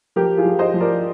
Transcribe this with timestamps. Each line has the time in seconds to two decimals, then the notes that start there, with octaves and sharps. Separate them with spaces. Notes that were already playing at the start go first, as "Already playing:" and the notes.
0.16 F3 G4 A#4
0.37 F4 G#4
0.45 F3
0.59 C5 D#5
0.74 F3
0.80 A#4 D5